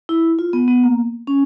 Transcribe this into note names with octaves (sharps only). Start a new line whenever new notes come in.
E4
F4
B3
B3
A#3
C#4